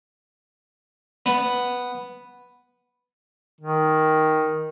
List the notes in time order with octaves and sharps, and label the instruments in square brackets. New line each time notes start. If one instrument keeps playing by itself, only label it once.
[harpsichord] B3
[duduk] D#3